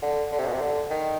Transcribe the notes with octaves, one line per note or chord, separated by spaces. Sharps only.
D3
D3
C3
B2
C3
D3
D#3